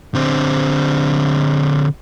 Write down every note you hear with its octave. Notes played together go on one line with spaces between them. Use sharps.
D3 C4